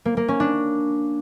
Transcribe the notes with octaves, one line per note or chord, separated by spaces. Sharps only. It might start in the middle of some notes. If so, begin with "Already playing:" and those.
A#3
A#3
C#4
D4